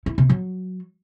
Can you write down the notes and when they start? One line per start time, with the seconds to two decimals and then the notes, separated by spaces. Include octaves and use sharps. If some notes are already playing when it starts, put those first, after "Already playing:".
0.06 E4
0.18 C3
0.29 F#3